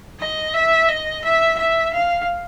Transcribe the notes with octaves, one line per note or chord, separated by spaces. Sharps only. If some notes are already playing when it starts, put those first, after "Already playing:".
D#5
E5
D#5
E5
E5
F5